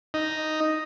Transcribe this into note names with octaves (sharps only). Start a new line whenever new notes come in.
D#4